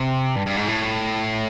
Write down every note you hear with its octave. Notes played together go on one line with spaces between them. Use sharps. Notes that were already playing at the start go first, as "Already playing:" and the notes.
Already playing: C3
G2
G2
G#2
A2